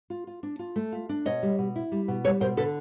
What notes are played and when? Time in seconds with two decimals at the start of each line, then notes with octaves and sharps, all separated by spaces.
0.10 F4
0.27 F4
0.43 D4
0.59 F4
0.76 A3
0.92 F4
1.09 D4
1.26 B2 C#5 D#5
1.43 G3
1.58 B2
1.76 E4
1.92 G3
2.08 B2
2.24 G3 B4 C#5
2.40 B2 A#4 C5
2.57 D3 A4 B4